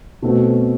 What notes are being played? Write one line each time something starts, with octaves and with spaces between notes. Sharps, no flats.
B2 A3 C4 F#4